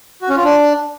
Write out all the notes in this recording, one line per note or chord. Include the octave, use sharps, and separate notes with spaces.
F#4
C#4
F4
D4